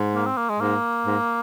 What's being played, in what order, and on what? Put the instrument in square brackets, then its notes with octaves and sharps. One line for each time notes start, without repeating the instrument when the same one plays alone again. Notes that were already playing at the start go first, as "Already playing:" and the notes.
Already playing: [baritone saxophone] G#2
[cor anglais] A#3
C4
A#3
G#3
[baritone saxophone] G#2 [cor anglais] A#3
[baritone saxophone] G#2